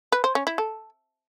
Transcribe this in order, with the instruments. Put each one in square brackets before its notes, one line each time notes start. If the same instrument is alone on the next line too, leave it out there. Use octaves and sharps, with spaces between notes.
[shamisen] B4
C5
C#4
E4
A4